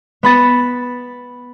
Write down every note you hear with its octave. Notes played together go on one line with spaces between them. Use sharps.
B3 B5 A6 E7